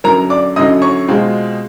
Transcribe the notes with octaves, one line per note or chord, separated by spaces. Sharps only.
F#2 D3 F#3 A#4 A#5
D5 D6
F#2 D3 F#3 D#5 D#6
C#5 C#6
B2 G#3 C4 F4